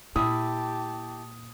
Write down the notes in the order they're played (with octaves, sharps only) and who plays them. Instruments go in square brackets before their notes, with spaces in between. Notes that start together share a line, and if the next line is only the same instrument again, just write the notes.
[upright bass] A#2 [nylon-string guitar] E4 [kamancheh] G4 A5 [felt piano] D#6